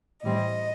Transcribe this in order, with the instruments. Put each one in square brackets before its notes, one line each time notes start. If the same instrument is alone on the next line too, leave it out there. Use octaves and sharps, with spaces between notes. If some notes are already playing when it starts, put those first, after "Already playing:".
[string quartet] A2 E3 G3 C4 D#5